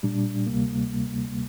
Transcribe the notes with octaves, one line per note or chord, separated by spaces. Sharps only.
A#2 G3 D4
D2 C3 G3 A#3